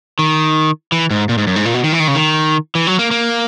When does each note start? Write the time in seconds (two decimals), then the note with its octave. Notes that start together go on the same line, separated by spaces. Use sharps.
0.19 D#3
0.92 E3
1.11 G#2
1.29 A#2
1.38 G#2
1.47 F#2
1.56 G#2
1.65 A#2
1.74 B2
1.84 D#3
1.92 E3
2.00 D#3
2.08 C#3
2.15 D#3
2.75 E3
2.87 F#3
2.99 A#3
3.11 A#3